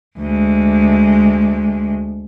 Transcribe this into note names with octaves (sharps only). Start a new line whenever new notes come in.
D2 G#3